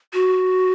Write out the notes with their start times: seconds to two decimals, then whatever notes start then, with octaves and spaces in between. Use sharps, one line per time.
0.13 F#4